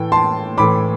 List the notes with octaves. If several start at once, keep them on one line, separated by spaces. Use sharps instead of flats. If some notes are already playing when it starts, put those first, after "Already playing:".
Already playing: A2 E3 A3 G5
A5 C6
A2 E3 A3 B5 D6